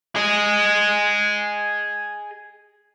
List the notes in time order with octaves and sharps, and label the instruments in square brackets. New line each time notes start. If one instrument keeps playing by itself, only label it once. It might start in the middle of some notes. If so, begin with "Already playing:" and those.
[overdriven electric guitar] G#4 D#5